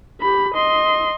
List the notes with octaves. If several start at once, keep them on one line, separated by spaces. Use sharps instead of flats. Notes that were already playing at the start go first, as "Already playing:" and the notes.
G4 B5
D#5 C6